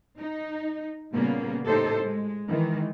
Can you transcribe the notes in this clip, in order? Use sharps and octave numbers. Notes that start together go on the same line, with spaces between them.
D#4
A#2 C#3 G3 A#3 B3
A2 D#4 G4 A4 C5
G#3
D#3 E3 G#3